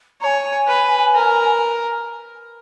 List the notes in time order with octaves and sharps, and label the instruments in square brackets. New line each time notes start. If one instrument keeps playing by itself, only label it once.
[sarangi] C#5 [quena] G#5 A#5
[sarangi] B4
A#4